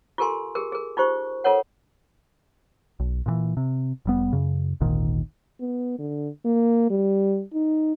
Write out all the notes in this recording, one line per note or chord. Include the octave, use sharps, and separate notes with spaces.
F4 G4 A4 A#4 G#5 C6
G4 G#4 A#4
G#4 A#4
D#4 F4 G4 C5 C#6
F4 A4 A#4 C#5 F#5
B1
A#2 C#3 E3
C3
F1 G3 B3
F#2 C#3
G#1 D2 A#2 D#3
B3
D3
A#3
G3
D#4